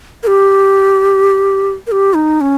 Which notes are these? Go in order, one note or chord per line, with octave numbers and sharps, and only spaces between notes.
A#4
G4
A#4
G4
D#4
C#4